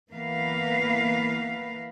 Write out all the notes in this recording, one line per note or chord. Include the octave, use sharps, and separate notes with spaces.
E3 A#3 B3 A#4 B4 F5